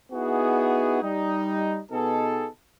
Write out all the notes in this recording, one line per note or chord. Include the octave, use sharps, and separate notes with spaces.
B3 D#4 E4 F#4 G#4
G3 D#4
B2 B3 D#4 G#4 A4